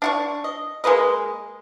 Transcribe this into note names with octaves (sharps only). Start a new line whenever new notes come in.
D4 F#5 C#6
D#5
G#3 A#3 B4 D#5